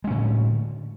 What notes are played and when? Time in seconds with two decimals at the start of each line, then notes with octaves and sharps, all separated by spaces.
0.04 G#3
0.07 C#4
0.11 A2
0.14 D3